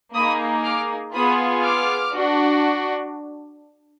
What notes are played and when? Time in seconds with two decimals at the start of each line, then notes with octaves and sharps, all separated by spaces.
0.14 A#3 D#4 G#4 B5 D#6
0.64 D6 F6
1.13 B3 F4 G#4 B5 D#6
1.62 D6 F6
2.12 D4 F#4